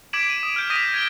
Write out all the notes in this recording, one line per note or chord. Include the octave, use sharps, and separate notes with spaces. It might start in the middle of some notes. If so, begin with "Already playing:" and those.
D6 G#6 B6 D7 E7 F#7
D#7
D#6
F6 G6 D7
D#6 A#6 B6 D#7
G#6 D7 G7